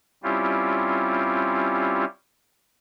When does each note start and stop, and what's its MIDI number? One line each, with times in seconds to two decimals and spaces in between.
0.23 2.05 55
0.23 2.05 60
0.23 2.05 61
0.23 2.05 64
0.23 2.05 65
0.23 2.05 67